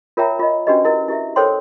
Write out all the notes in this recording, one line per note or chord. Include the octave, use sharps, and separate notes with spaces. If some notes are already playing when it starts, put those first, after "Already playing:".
F4 A#4 C#5 E5 G5 A#5
F4 D#5
C#4 D4 F#4 G4 B4 D#5
E4 A#4 D#5
E4 G4 E5
A4 A#4 C5 C#5 G5 C6